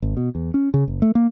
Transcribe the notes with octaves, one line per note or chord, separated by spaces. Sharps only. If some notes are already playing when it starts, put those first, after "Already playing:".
G#1
B2
E2
C#4
C#3
F#1
A3
A#3